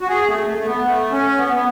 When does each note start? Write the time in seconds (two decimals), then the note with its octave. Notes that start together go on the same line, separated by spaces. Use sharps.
0.01 F#4
0.08 G#4
0.27 A3
0.47 A3
0.58 A3
0.66 B3
0.85 A3
1.12 C#4
1.38 B3
1.53 B3